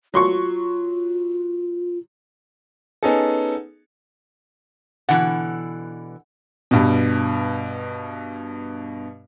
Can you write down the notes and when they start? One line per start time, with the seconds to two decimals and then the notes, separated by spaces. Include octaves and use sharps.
0.14 F#3 F4 C6 C#6
3.03 B3 C#4 D#4 G#4 A4
5.09 B2 D3 E3 F#5
6.71 G2 B2